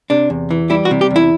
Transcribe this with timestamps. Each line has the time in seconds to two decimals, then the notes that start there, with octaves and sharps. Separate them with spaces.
0.10 C3 D4
0.30 E2
0.51 E3
0.70 G3 E4
0.85 F#4
0.91 C3
1.01 G4
1.11 E2
1.16 E4